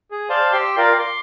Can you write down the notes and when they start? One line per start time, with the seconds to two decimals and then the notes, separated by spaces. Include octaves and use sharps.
0.11 G#4
0.30 C5 D5 F5 A5 C6
0.53 G4 G5 C6 E6
0.78 F4 A#4 D5 F5 G5
0.99 C6 D6